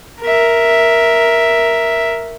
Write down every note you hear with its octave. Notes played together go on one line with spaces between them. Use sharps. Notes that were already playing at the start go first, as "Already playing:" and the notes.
A#4 E5